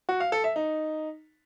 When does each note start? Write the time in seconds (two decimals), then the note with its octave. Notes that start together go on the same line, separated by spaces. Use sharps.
0.09 F#4
0.20 F5
0.32 A4
0.44 E5
0.56 D#4